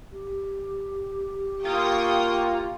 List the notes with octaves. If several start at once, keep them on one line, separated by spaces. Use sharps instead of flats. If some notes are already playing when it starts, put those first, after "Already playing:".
G4
A#3 F4 G5 C#6 D#6